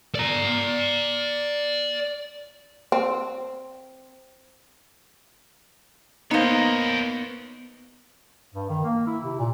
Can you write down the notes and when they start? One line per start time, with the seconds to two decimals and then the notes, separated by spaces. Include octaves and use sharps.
0.15 D5 A#5
2.92 C4
6.31 A#3 B3 D#4 A#4 C5 C#5
8.54 G2
8.69 D#3
8.84 A#3
9.07 E4
9.24 C3
9.39 A#2